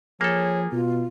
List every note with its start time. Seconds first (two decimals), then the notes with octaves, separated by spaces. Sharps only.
0.21 F3 A#3 G#4 A4 C#5
0.72 B2 F4